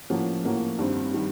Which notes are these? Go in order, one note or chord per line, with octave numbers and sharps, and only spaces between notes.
A2 F3 A#3 C#4 F#4
A2 F3 A#3 C#4 F#4
G2 D#3 G3 C4
D#3 G3